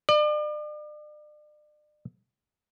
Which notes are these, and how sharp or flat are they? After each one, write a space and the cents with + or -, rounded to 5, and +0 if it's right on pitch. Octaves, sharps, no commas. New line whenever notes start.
D5 +40